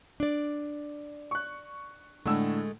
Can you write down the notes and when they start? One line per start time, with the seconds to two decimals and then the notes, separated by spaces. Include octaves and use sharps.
0.20 D4 D5
1.31 C#6 F#6
2.26 A2 D3 G#3 A3 E6